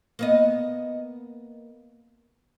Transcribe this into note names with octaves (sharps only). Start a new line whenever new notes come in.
A#3 B3 D#5